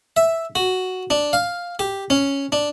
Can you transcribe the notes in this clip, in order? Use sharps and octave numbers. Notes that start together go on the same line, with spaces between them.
E5
F#4
D4
F5
G4
C#4
D4